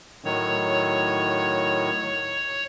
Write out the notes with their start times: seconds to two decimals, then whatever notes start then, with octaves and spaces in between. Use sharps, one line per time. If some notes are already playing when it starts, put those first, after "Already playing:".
0.24 A2 D#3 F#3 C#5